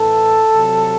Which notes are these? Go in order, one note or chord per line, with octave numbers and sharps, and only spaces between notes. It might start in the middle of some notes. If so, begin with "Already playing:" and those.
Already playing: A2 E3 A4
C3 F#3